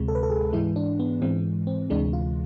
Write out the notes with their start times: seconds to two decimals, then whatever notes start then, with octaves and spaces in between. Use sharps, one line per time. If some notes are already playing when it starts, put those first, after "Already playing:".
Already playing: D2 C3 G#3
0.08 A4
0.15 B4
0.23 A4
0.30 G#4
0.53 G#2 E3 G#3 E4
0.76 D4
1.00 B3
1.22 G#2 E3 G#3 C4
1.67 C4
1.90 D2 C3 E3 G#3 D4
2.13 F4